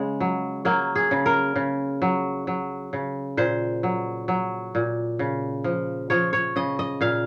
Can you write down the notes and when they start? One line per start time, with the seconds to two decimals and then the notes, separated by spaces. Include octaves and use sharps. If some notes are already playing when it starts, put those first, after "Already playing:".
Already playing: C#3 G#3
0.20 F#3
0.65 F#3 A#3
0.95 G#4
1.11 C#3
1.26 A#4
1.56 C#3
2.02 F#3
2.47 F#3
2.93 C#3
3.37 A#2 C5
3.83 F#3
4.28 F#3
4.75 A#2
5.19 C#3
5.64 F3
6.10 F3 C#5
6.33 C#5
6.56 C#3 D#5
6.79 D#5
7.01 A#2 F5